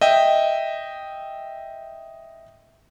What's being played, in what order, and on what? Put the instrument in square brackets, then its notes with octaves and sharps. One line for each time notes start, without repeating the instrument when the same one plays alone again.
[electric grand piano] D#5 E5 G5